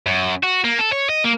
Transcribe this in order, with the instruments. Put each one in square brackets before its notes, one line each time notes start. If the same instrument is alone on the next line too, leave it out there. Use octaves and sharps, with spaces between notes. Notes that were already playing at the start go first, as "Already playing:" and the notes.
[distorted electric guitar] F#2
F#4
A#3
A4
C#5
D#5
A#3